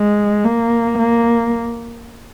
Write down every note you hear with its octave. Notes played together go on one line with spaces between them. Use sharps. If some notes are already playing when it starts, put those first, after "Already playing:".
Already playing: G#3
A#3
A#3